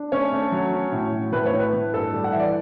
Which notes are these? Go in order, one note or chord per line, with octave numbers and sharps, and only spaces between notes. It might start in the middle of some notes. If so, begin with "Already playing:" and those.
Already playing: D4
A3 C#4 C#5
A3
F#3
C#4
A2
F#3
A2 B4
C#5
A2
B4
A2
G2 A4
G3
F#5
E3 E5
D5